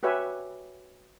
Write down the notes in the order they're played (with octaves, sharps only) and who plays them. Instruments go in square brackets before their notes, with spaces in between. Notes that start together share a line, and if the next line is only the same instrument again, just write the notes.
[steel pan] F#4 G4 B4 C#5 E5 G#5